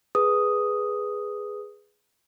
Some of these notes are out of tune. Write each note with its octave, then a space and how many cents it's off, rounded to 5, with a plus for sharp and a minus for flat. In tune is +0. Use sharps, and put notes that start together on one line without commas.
G#4 +0 B4 +0 D#6 +0